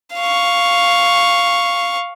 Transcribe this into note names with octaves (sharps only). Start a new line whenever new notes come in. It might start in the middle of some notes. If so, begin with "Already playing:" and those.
F5 C#6